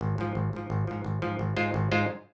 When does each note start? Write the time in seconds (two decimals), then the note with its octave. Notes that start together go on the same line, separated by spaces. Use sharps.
0.01 G#1
0.18 G#2 F3
0.35 G#1
0.53 G#2 F3
0.70 G#1
0.87 G#2 F3
1.04 G#1
1.22 G#2 F3
1.39 G#1
1.56 G#2 G#3 F4 C5
1.74 G#1
1.91 G#2 G#3 F4 C5